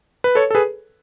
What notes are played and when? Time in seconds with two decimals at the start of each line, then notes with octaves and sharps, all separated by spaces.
0.24 B4
0.35 A4 C#5
0.51 A4
0.55 G#4 B4